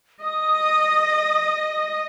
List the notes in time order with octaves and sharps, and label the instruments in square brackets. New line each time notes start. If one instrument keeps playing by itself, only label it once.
[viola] D#5 [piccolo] D#6